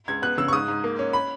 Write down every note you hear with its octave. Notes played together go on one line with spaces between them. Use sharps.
C#2 G#6
B3 F#6
C#3 E6
C#6
G#2 D#6
G#2
A#3
C#4
B5